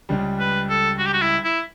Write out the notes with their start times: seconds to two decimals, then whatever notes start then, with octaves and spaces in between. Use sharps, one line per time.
0.09 C#2 C#3 G3
0.40 B4
0.69 A4
0.99 F#4
1.06 G4
1.14 F#4
1.22 E4
1.44 E4